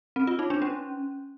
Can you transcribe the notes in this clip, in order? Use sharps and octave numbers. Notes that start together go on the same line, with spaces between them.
C4
F4
D#4
D4
C#4